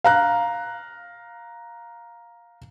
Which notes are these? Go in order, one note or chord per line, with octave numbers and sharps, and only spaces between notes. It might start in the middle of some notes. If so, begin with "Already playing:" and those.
F5 A#5 F#6